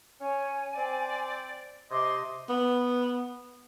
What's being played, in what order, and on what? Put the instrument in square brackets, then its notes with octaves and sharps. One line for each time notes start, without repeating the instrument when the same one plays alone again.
[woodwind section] C#4 C#5 [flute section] G#5
[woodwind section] C4 C5 D5
[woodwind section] C3 D#5 [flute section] C6 D6
[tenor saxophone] B3